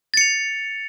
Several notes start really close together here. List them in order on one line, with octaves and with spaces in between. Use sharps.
A6 C#7 F7